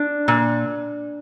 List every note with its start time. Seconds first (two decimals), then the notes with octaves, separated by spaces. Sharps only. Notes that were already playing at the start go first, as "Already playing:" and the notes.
Already playing: D4
0.28 A#2